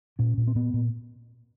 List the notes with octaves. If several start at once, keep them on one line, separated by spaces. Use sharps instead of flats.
A#2 C#4
A#2
C4
A#2 B3
A#2